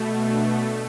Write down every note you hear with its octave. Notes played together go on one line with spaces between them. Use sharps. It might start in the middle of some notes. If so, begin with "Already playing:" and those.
Already playing: B2 A3
D4